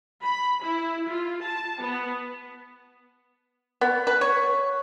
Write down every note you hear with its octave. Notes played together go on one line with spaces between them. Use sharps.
B5
E4
F4
A5
B3
B3
B4
C#5